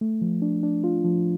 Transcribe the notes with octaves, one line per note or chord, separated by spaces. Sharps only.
A3
F3
D4
D4
F4
F3